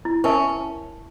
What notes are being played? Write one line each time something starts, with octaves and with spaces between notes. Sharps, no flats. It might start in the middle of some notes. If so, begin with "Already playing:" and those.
E4
C#4 A#4 E5 A5